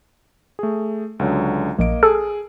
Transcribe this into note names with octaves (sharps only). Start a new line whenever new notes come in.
A3 G#4
C#2 D3 F#3
A#1 A#3 D#5 D7
G#4 A4